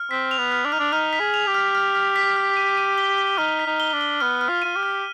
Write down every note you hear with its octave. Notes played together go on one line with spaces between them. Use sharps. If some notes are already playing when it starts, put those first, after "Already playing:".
Already playing: F6
C4 B6
F7
B3
F6
D4
D#4 F6
D4
D#4 F6
B6
G#4
F7
G4
F6
F6
F6
B6
F6
D#7
D#7
G7
G7
D#4 F6
B6
D#4
G7
D4
G7
B3 F6
F6
F4
F4 D#7
G4
F6